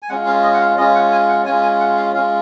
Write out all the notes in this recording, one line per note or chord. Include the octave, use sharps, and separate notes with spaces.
G#5
G#3 C#4 F4 F#5
F5
D#5
F#5
F5
G#3 C#4 F4 D#5
F#5
G#5
F#5
G#3 C#4 F4 G#5
G#5
F#5
F5
G#3 C#4 F4 F5